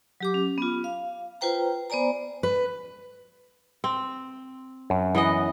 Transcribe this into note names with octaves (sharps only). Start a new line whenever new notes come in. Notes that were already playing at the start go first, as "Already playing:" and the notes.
F#3 G4 D6
C#4
B3 F4
F5
F4 B4 C5 G5 A#5
B3 C5 D5 G#5 A#5
B4
C4
F#2
E3 B3 D#5